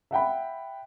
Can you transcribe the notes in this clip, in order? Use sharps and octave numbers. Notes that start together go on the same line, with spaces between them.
E5 F#5 G5 B5